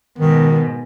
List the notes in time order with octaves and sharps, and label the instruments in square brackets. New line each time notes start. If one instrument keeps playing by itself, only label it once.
[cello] G#2 B2 [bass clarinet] D#3